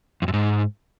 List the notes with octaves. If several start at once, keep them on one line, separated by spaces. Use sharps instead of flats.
F2
F#2
G#2